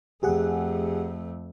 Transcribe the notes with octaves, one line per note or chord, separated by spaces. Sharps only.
F2 A3 G4 G#4 F#5